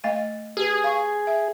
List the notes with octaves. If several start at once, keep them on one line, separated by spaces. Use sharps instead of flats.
A3 D#5 F5
G4 G#4 B4
F5 C#6
E5